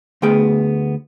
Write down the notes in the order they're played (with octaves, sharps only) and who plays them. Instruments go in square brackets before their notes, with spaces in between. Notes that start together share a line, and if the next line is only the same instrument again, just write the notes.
[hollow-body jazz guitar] D2 A3 B3 G#4 G5